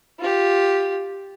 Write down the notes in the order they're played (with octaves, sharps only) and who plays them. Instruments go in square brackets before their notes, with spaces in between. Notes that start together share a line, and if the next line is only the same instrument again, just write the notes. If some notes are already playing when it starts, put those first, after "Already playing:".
[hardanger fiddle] F4 G4